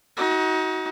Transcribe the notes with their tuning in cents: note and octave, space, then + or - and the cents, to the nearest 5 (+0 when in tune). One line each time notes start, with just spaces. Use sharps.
D#4 +30 F#4 +10